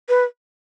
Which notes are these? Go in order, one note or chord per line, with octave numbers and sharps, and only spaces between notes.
B4